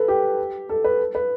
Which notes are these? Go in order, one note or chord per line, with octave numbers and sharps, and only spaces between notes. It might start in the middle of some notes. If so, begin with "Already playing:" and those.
Already playing: A4 B4
G4
A4
B4
B4